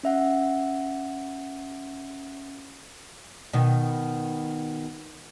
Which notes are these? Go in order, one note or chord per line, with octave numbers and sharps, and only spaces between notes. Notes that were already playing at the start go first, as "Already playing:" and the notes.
C#4 E5 F#5
B2 D#3